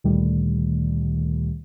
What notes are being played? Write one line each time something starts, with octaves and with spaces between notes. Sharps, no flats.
D2 A#2 D#3 G3 A3